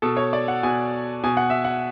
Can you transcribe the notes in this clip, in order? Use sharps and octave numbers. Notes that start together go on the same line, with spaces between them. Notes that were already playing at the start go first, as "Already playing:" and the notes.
B2 A4
C#5
D5
F#5
B2 G#5
B2 G#5
F#5
E5
F#5